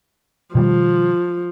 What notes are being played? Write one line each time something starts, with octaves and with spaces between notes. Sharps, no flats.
B2 D#3 F3 G3